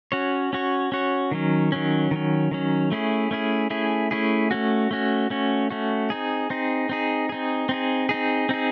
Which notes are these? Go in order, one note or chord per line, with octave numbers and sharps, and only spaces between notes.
C#4 F#4 C#5
C#4 F#4 C#5
C#4 F#4 C#5
D#3 F#3 C#4
D#3 F#3 C#4
D#3 F#3 C#4
D#3 F#3 C#4
A3 C#4 E4 G#4
A3 C#4 E4 G#4
A3 C#4 E4 G#4
A3 C#4 E4 G#4
A3 C#4 F#4
A3 C#4 F#4
A3 C#4 F#4
A3 C#4 F#4
C4 D#4 G#4
C4 D#4 G#4
C4 D#4 G#4
C4 D#4 G#4
C4 D#4 G#4
C4 D#4 G#4
C4 D#4 G#4